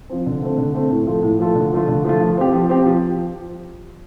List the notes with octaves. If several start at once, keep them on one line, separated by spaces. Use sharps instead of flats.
F3 C4
D3
A3 C4
D3
A3 C4
A2
F3 A3 F4 A4
A2
F3 A3 F4 A4
D3
F3 A3 F4
D3
F3 A3 F4
F3
C4 G4
F3
C4 G4
F3